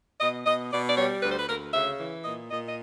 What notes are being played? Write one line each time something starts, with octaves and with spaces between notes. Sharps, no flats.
B2 D#5
B2 D#5
B2 D5
D5
G3 C#5
D2 B4
C5
B4
D2 A#4
C#3 E5
E3
A#2 D#5
A#2 D#5
D#5